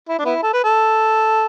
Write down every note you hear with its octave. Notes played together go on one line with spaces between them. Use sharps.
E4
D4
B3 E4
A4
B4
A4